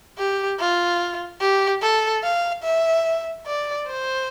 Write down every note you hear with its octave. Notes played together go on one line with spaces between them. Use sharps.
G4
F4
G4
A4
F5
E5
D5
C5